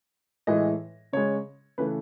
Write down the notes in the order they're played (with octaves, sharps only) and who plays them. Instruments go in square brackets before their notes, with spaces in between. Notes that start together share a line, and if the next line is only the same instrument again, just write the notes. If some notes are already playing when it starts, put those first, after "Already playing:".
[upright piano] A2 E3 G#3 D#5
C#3 G#3 C#5
C#3 E3 A3 B4